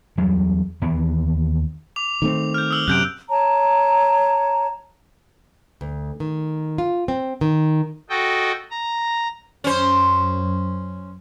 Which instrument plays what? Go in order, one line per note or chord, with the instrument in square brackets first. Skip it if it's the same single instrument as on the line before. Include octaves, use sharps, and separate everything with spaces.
[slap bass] E2 F#3 G3
D#2 E3 B3
[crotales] D6 F7
[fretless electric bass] D#3 A3 C4
[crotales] F6 G6
D#6 E6 F#7
[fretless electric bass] F#2 C3 [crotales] F#6 G6 D7
[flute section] C#5 A5 A#5
[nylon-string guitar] D2
D#3
F4
C4
D#3
[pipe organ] F#4 A4 D#5 G5
A#5
[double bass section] F#2 [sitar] C#4 C5